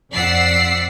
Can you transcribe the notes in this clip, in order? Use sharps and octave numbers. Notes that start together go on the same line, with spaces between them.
F2 D5 F#5 E6 B6 C7